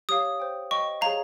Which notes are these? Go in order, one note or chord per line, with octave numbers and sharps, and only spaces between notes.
G4 C#5 F5 D#6
C5 G5
C5 D#5 G5 C#6
G#4 C#5 F5 A#5